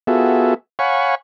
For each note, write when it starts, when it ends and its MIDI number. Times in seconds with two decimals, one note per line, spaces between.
0.07 0.54 59
0.07 0.54 65
0.07 0.54 66
0.07 0.54 68
0.07 0.54 69
0.07 0.54 76
0.79 1.15 73
0.79 1.15 77
0.79 1.15 78
0.79 1.15 80
0.79 1.15 83
0.79 1.15 85